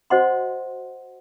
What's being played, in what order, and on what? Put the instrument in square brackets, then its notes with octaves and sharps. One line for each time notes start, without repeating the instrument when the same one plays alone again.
[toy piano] F#4 C5 D#5 F#5 C6